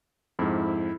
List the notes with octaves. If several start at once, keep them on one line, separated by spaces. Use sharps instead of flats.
F2 G#2 E4